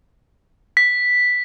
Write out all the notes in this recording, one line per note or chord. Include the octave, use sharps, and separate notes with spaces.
B6